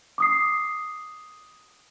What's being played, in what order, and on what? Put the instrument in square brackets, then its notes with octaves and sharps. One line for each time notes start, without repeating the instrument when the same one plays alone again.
[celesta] D6 D#6 C7